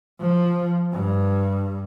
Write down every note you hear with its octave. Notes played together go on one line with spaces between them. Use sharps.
F3
G2